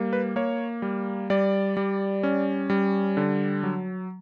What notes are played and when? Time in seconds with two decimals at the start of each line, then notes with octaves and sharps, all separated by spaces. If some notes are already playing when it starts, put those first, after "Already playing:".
Already playing: G3 A#3
0.13 B4
0.36 A#3 C#5
0.82 G3
1.30 G3 D5
1.77 G3
2.23 C#4
2.70 G3
3.17 D3
3.63 F#3